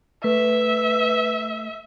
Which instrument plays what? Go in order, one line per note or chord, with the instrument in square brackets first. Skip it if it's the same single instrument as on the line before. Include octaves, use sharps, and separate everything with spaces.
[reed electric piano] A3 [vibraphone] B4 [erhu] E5